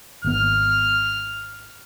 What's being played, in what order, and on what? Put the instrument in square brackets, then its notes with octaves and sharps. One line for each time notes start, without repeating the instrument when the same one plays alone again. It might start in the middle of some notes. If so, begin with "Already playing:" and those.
[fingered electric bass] G#1 B3 [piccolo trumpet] F6